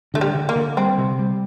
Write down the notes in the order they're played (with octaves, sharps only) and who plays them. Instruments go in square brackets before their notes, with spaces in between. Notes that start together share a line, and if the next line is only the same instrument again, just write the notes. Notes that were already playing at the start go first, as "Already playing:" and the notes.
[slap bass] D3 [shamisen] A3
[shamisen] G3
[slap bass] D3
[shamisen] A#3
[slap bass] D3
[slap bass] G3 [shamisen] C4
[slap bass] C3
G3